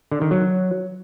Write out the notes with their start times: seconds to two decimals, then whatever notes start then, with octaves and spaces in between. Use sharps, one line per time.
0.11 D3
0.21 D#3
0.31 F#3